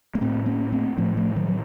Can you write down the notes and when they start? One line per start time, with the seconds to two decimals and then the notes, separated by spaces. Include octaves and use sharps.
0.15 A#3
0.21 A2 A3 C4
0.46 A#3 C#4
0.72 A3 C4
0.98 A2 F3 A3
1.17 F3 A3
1.36 D#3 F#3
1.49 F#3